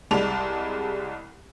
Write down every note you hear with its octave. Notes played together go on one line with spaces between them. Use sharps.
C2 G3 G#3 D5 A5 F7